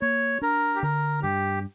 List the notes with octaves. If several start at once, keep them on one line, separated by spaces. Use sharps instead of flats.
A#3 C#5
D4 A#4
G4
D3 A#4
G2 G4